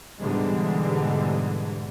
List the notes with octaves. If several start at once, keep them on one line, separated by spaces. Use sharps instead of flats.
G#2 B2 D3 E3 G3 G#3